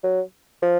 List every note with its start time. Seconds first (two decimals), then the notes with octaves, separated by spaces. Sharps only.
0.03 F#3
0.62 F3